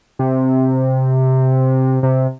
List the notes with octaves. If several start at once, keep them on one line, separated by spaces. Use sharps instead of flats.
C3
C3